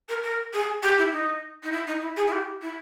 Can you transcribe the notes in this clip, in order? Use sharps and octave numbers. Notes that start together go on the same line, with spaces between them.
A#4
A#4
G#4
G4
E4
D#4
D#4
E4
D#4
E4
G#4
E4
G4
E4